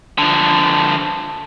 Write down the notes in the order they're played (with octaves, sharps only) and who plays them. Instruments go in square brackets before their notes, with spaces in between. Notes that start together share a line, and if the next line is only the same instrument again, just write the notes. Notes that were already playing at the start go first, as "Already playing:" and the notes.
[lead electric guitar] D3 F3